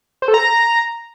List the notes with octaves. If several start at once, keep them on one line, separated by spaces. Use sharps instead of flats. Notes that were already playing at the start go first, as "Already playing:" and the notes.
C5
A4
A#5